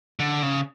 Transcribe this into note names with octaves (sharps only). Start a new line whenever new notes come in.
D3
C#3